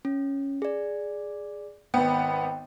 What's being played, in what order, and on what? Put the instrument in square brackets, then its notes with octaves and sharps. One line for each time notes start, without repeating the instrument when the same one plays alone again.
[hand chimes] C#4
G#4 D5
[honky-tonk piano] G#1 B3 [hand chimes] G5